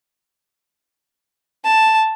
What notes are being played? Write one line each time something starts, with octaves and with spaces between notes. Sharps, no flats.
A5